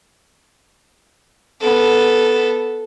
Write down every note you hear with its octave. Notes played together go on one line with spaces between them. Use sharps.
B3 A4